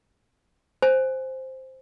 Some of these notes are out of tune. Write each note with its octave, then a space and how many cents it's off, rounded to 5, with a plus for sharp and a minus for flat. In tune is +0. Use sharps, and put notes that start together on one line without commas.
C5 +0 G#5 +0